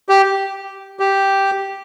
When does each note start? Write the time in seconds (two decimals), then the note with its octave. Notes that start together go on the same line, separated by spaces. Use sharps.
0.09 G4
1.00 G4